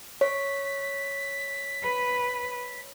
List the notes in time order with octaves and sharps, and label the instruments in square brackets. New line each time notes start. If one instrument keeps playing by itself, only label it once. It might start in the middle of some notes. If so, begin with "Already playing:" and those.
[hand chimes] C#5 [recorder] B6
[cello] B4